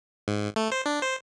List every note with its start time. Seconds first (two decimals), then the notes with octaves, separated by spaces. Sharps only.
0.28 G#2
0.56 A3
0.72 C5
0.86 D4
1.02 C5